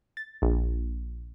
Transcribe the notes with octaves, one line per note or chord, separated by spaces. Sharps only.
A6
A#1